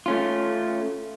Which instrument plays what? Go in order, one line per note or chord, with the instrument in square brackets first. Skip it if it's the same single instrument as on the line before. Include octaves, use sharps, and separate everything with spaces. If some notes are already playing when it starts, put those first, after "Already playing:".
[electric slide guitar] A3 C#4 F4